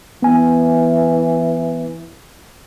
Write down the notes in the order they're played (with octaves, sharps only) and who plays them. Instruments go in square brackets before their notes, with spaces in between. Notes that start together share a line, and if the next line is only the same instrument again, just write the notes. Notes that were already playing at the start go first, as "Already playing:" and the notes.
[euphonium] E3 [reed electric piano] B3 G#5